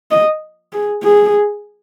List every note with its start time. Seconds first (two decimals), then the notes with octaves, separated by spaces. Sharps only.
0.11 D#5
0.73 G#4
1.03 G#4